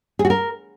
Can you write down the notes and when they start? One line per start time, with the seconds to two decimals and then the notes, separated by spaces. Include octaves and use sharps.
0.19 G#4
0.25 F#4
0.30 A#4